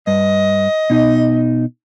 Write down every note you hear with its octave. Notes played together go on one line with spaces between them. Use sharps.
G2 D#5
B2 D#4